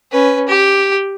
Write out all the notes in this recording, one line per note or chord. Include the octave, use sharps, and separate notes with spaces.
C#4 B4
G4